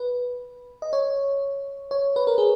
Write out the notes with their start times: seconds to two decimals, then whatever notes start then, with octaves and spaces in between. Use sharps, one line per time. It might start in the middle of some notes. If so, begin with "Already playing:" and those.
Already playing: B4
0.82 D#5
0.93 C#5
1.91 C#5
2.16 B4
2.27 A#4
2.38 G#4